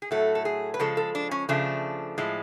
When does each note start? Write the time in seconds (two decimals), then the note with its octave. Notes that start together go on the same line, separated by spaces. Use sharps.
0.02 G#4
0.11 A2 F#3 A3 A4
0.35 A4
0.45 G#4
0.74 B4
0.79 C#3 F3 G#3 A4
0.97 A4
1.15 D4
1.31 C#4
1.49 C#3 F3 A3 D4
2.18 A2 F3 G#3